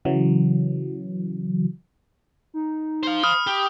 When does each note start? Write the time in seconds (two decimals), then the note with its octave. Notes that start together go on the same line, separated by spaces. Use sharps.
0.05 C#3 E3 F#3
2.54 D#4
3.03 C5 F5
3.23 B5 D#6 F6
3.47 G4